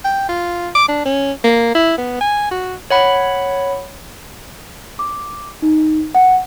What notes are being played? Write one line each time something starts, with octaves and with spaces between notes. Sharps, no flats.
G5
F4
D6
D4
C#4
A#3
E4
B3
G#5
F#4
C#5 F#5 B5
D6
D#4
F#5